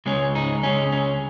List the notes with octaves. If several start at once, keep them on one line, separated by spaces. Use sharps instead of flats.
C#2 C#3 G#3 C#4
D#4
C#2 C#3 G#3 C#4
C#4